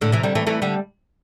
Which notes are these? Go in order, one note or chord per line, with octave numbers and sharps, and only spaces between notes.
A2 D3
C3 E3
D3 G3
E3 A3
E3 A3
D3 G3